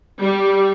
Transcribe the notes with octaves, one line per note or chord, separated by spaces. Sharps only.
G3